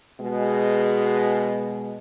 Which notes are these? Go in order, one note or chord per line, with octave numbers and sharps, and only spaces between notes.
B2 G#3